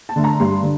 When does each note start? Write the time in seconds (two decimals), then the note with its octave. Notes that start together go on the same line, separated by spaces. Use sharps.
0.09 A5
0.16 D3 A3
0.24 A#5
0.40 G2 C6
0.63 D3